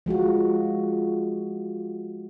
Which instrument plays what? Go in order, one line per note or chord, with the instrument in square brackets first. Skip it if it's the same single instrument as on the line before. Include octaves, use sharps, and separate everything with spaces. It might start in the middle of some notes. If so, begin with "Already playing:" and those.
[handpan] F3 G#3 F4 F#4